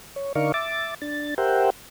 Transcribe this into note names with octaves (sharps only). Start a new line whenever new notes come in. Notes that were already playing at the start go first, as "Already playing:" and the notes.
C#5
D3 D#4 A#4 D5 F5 C#6
E5 D6 A6
D4 A6
G4 A#4 C5 E5 F#5 G5